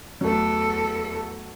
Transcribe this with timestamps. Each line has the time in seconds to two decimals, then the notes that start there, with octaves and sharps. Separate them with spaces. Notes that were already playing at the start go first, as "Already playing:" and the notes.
0.21 E2 F#3 A3 A4